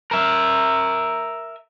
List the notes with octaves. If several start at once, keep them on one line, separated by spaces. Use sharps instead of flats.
A#4 E5